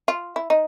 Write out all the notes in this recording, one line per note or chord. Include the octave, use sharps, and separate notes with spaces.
F4
E4
D#4